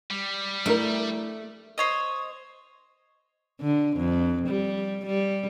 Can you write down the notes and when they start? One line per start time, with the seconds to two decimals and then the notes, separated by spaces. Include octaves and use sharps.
0.11 G3
0.66 A3 D4 E4 A#4
1.78 C5 C#5 D#5
3.61 D3
3.97 F2
4.47 G3
5.06 G3